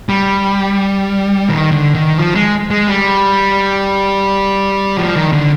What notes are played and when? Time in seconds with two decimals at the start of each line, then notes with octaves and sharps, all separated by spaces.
0.09 G3
1.49 D#3
1.72 D3
1.95 D#3
2.18 F3
2.35 G#3
2.71 G#3
2.87 G3
4.97 F3
5.15 D#3
5.33 D3